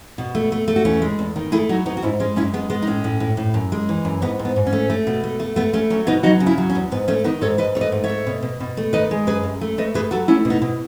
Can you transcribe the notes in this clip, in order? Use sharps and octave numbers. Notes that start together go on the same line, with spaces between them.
B2
A3
A3
A3
F#4
E2 C#4 E4
G#3
E2
D#3
A3 E4 G#4
F#3 D#4 F#4
F#3 B3 D#4
F#4
G#2 C#4 E4
G#3 C#4
F#2 C#4 E4
G#3 B3
G#3 B3
D#4
A2 C#4
A2
A2
A2
F#2
G#3
E3
F#2
G#2 B3
G#2
B3
G#2
C#4
A3
A3
B2
A3
A3
A3 B3
A3 C#4
F#3 C#4
B2 B3 D#4
F#3 D#4 F#4
C#3
C#4 E4
F#3
C#4
E2
G#2 B3
A3 C#4
D#3 B3 D#4
G#2 A4 C#5
G#2 B4 D#5
A3 C#5
B4 D#5
G#2
C#5 E5
A3
B2
B2
B2
A3
D#3 B4 D#5
G#3
F#2 G#4 B4
F#2
A3
A3 B4 D#5
A3 G#4 B4
F#3 F#4 A4
A3 C#4 E4
B2
B3 D#4
B2